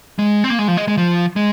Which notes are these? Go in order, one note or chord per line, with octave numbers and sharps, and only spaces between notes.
G#3
C4
A#3
G#3
F3
G#3
G#3
F3
G#3